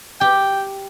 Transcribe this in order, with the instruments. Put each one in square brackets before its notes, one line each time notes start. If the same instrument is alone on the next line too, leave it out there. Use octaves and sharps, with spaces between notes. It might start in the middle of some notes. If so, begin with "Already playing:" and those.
[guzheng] G4 [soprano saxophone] G5